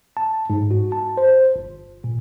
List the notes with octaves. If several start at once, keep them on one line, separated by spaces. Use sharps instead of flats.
A5
G#2
F#4
A5
C5
G1
A#2